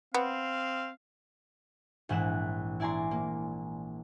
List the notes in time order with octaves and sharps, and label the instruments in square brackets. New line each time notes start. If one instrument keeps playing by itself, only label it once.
[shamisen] B3 [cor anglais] C4 [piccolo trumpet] F5
[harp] A#1 G#2 E3 F#6 E7
E4 D5 G#5 A#5 C6
A#3